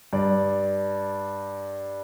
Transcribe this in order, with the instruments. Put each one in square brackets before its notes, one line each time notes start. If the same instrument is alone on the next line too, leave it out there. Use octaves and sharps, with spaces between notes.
[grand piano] G2 D5